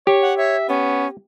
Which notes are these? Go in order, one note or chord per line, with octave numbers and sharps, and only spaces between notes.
G4 C#5
F#5
C#5 E5
B3 C#4